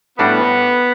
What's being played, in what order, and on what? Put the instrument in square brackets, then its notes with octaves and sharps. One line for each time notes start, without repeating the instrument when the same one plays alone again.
[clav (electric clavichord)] A2 G3 D4 F#4 [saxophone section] B3